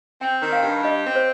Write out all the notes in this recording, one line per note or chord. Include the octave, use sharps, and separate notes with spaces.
C4 G5
D#3
F5
G2
G4 D#5
C4
C5